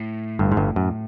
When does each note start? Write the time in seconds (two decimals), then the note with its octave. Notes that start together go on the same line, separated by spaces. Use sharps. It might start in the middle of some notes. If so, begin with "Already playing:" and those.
Already playing: A2
0.39 G1 G2
0.52 G#2
0.57 G1 G2
0.76 F#2